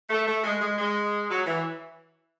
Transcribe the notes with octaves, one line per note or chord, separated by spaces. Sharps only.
A3
A3
G#3
G#3
G#3
F#3
E3